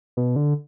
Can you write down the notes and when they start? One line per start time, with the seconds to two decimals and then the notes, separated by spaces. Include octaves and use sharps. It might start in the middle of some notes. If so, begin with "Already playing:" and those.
0.17 B2
0.36 D3